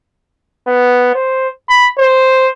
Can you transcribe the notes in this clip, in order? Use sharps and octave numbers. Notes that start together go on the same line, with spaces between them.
B3
C5
B5
C5